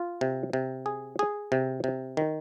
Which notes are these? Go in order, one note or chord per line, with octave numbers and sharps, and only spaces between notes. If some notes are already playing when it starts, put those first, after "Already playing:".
Already playing: F4
C3
C3
G#4
G#4
C3
C3
D#3